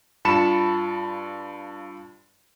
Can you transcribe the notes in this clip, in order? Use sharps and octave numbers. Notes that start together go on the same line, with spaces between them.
G2 F4 A5 B5 C#7 E7